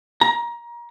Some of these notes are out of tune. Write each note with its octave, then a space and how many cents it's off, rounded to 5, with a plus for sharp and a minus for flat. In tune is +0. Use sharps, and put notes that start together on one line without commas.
A#5 +25